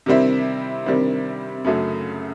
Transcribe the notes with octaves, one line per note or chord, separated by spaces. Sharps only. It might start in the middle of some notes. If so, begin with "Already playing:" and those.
C3 D#3 G3 C4 E4
C3 D#3 G3 C4 E4
F#2 C#3 F#3 A3